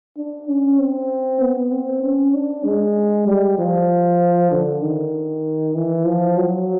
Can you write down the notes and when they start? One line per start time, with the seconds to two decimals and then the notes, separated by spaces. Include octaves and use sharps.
0.18 D4
0.48 C#4
0.79 C4
1.41 B3
1.71 C4
2.03 C#4
2.34 D4
2.64 G#3
3.27 G3
3.58 F3
4.51 D3
4.82 D#3
5.75 E3
6.05 F3
6.37 F#3